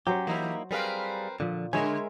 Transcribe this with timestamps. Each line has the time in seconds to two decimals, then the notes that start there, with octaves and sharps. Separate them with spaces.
0.07 F#3 C#4 G4 C5
0.27 E3 A#3 D#4 E4 G4
0.71 G3 C4 G#4 A#4 B4 F5
1.40 A#2 D3 F3
1.73 D3 G#3 A#4 C#5 E5 G#5